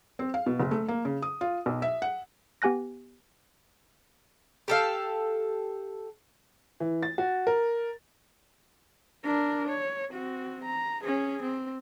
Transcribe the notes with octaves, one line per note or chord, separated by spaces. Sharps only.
C4
F5
B2
F#1
A3
A#3
C#3
D#6
F4
B1
E5
F#5
B3 G4 G#5 F#6 A#6
G4 A4 F5
E3
A6
F#4
A#4
D4 A#4
C#5
C4 F#4
A#5
C#4 G#4
C4